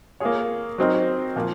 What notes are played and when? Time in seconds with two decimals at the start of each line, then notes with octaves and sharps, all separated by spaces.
0.20 A#3 F4 G#4 C#5
0.78 F#3 C4 D#4 A#4
1.36 A#2 F3 A#3